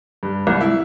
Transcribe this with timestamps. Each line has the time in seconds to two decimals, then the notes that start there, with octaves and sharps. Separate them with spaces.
0.23 G2
0.47 C2
0.61 E4